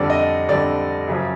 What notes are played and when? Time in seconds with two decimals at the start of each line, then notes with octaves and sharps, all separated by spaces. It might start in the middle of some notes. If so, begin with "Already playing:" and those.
Already playing: F2 D3 G3 D5
0.10 D#5
0.48 F2 D3 G3 D5
1.08 F#2 C#3 F3